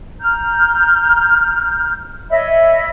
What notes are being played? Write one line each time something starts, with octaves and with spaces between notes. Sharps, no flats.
A#5 F6 G6
C#5 D#5 E5 B5